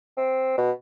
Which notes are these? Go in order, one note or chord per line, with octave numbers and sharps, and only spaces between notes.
C4
B2